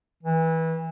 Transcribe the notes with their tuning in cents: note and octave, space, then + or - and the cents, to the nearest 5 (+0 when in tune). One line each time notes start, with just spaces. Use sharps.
E3 -25